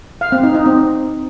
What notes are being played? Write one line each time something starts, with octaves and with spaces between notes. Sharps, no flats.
F5
C4
D#4
D#4
C4